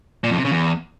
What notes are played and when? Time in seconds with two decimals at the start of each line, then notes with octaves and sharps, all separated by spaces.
0.24 A#2
0.31 F2
0.38 C3
0.45 C#3
0.52 E2